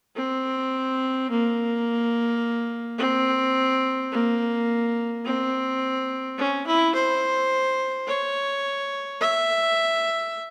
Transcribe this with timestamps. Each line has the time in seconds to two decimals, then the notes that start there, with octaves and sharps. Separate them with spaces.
0.16 C4
1.30 A#3
2.98 C4
4.12 A#3
5.25 C4
6.38 C#4
6.67 E4
6.94 C5
8.07 C#5
9.21 E5